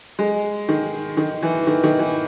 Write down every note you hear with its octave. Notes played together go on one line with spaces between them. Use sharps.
G#3
D#3
D#3
E3
D#3
D#3
E3